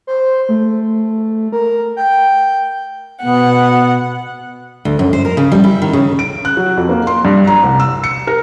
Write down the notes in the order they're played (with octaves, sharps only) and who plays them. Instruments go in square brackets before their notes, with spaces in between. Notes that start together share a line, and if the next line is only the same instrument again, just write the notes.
[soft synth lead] C5
A3
A#4
G5
[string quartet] B2 F#5 [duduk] B3
[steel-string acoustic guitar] D2
F#2
C5
A#4
C#3
G3
E4
D#3
C#3
[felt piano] D7
F#6
F#3
F2
A#3
C6
G2
A#5
C2
E6
C#7
A#4